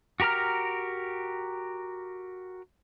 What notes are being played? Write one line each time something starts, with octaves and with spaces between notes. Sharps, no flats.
F#4 G4 A#4 A#5 F6